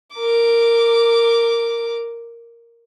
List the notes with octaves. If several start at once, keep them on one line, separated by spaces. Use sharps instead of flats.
A#4 D6